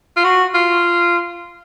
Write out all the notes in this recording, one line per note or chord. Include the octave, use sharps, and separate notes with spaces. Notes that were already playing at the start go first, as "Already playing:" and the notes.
F4
F#4
F4